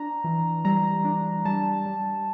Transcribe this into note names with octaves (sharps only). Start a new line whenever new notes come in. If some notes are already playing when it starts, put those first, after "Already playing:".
Already playing: D4 A#5
E3
G3 A#5
D4
G3 A5
G3